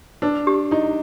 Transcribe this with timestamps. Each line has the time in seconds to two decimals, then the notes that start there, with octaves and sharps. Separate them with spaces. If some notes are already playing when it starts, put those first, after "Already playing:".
0.22 D4 B4
0.47 G4
0.71 D#4 E4